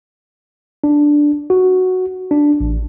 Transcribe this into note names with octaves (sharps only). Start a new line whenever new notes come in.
D4
F#4
D4
A1